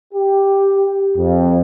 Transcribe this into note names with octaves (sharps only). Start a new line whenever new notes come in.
G4
F2